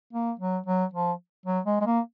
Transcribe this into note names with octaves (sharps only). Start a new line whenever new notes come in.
A#3
F#3
F#3
F3
F#3
G#3
G#3
A#3